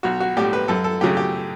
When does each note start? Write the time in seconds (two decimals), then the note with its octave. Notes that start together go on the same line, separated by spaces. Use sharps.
0.03 B1 F#4
0.20 F#4
0.37 A2 G3 G4
0.53 B4
0.68 F#2 A4
0.84 A4
1.01 C#3 F#3 A3 G4
1.17 G4